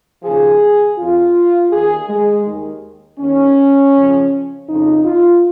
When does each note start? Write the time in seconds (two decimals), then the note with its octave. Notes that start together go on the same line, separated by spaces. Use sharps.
0.22 D#2 C#3 F3 G#4
0.97 F2 F3 F4
1.71 D#2 D#3 G#4
2.08 G#3
2.46 D#2 D#3
3.19 D#2 D#3 C#4
3.93 F2 C#3 F3
4.68 F2 C#3 F3 D#4
5.05 F4